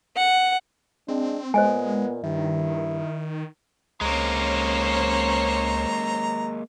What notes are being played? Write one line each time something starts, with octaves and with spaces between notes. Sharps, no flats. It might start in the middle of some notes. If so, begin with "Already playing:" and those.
F#5
G#3 C4 D4
A#2 G#3 B3 C5 D#5 G#5
G2 D#3 E4
C#2 G#3 A#3 C#4 C5 C#5 A#5